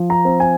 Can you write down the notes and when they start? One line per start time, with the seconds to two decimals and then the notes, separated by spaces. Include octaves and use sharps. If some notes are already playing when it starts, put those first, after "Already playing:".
Already playing: F3
0.10 A#5
0.25 C4
0.40 G#5